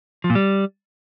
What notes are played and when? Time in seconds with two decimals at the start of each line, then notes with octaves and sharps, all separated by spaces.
0.24 F3
0.30 A#2
0.35 G3